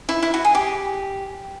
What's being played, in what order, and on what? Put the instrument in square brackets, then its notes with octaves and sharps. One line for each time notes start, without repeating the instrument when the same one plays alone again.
[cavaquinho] E4
E4
F#4
G#4
G4